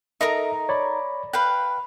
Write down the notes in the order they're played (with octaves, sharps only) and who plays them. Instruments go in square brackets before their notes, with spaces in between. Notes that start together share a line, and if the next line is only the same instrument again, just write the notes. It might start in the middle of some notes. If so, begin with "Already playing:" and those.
[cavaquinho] D#4 A#4 A#5 [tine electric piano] A4 D#5 E5
[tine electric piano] C#5 D5 B5
[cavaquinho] B4 F5 G5 [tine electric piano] F#6